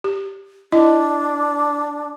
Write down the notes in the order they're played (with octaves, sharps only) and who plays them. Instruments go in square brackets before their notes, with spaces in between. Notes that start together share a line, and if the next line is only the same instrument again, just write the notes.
[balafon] G4
[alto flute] D4 [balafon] E4 D#5